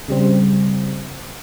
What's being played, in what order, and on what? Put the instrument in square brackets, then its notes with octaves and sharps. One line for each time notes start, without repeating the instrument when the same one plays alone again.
[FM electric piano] C#3 G3 C4